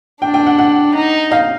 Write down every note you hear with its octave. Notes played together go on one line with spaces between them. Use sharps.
D4 G5
G5
F#5
F#5
D#4
F5